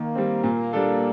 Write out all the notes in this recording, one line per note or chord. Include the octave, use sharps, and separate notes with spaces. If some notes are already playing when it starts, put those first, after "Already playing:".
Already playing: D#3 A#3
G3 C4
A#2
G3 D4 A4